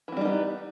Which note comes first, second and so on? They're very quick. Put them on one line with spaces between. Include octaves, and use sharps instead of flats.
E3 C4 G3 D#4 B3